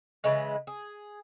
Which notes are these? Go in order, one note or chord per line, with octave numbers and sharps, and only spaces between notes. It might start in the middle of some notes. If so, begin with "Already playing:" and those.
C#3 E3 G#3
G#4